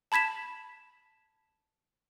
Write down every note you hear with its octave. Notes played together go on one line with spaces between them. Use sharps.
A5 B5 G#6 B6 E7